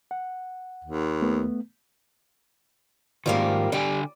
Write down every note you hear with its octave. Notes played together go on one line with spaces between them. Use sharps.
F#5
D#2
A3 B3
G#2 D#3 F3 G3 A#3
D3 G3 G5 G#5